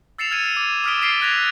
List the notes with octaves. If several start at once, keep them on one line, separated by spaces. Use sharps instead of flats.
E6 A6 C7 C#7 E7 F7
F6 G#6 C#7 D#7
D6
D6 D#6 F6 B6 D7 G7
A6 B6 C7 D7 G7
E6 F#6 G#6 A#6 B6 F7